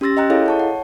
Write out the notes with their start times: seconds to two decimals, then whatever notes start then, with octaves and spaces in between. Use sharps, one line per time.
0.01 C#4 G4 C6 E6 A6 A#6
0.17 D#5 G5 A#5 F#6
0.30 E4 G#4 A4 C#5 D#5 F5
0.46 C#5 A5 C#6
0.60 F#5